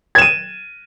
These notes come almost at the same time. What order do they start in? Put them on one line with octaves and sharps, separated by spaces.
G#6 E7 D#7